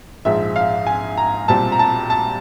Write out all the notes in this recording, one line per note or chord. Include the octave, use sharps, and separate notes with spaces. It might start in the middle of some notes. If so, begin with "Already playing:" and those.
A#1 G#2 F3 G#3 E5
F5
G#5
A#5
B1 A#2 G3 C4 A5
A#5
A5
A5